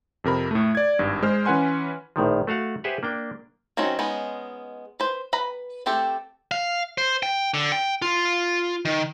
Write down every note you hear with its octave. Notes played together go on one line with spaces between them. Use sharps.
F2 C3 A#4 B5
A2 A3
D5 G#6
G#1 G2
G#3 C5 F6
E3 C#4 B4 F#5 G#5 C6
A#1 A2 D#3 F3
A3 F#4 F5 F#5
G4 G#4 B4 C5 E5 F#5
A#3 D4 G5
D#3 F#3 C4 C#4 F#4
G#3 B3 C#4 D#4
B4 C5
B4 A#5 B5
A3 C4 G4 A4
F5
C5
G5
D3
G5
F4
D#3